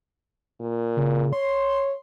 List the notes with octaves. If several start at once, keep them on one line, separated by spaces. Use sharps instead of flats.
A#2
C#3
C#5 C6